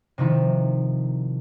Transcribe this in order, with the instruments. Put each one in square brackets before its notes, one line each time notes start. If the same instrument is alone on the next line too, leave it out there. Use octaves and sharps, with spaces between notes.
[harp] C3 D#3 F3 E4